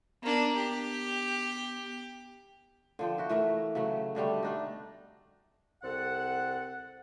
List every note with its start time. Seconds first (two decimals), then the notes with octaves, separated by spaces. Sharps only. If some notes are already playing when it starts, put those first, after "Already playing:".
0.22 A#3 B3 D4
0.55 G4
2.99 D3 F3 G5
3.18 E4 F#4
3.29 E3 A3 A#4
3.75 C#3 F#3 A3
4.15 B2 D3 G3 A3
4.43 A3 D4 D#4
5.82 C2 C4 A4 F#5